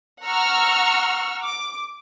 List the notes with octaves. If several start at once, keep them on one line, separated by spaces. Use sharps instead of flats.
F#5 A#5 C#6 E6 F6
D6